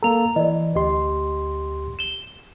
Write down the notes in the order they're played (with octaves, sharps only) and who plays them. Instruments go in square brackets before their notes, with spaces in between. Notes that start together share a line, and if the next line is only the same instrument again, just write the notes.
[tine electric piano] A#3 A4 [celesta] A#5 F7
[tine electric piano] E3 [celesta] D5 D#5
[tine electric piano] D2 G4 C6 [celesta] D#5
[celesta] E7 G7